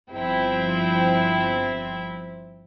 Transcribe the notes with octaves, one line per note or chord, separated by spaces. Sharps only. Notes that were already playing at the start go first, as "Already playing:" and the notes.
G1 F3 C4 E4 G5